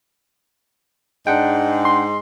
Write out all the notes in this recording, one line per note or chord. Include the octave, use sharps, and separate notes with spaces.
G#2 G#3 D4 F#5 G5
C6